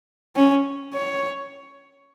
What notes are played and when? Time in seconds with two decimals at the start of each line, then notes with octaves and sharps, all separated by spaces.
0.36 C#4
0.94 C#5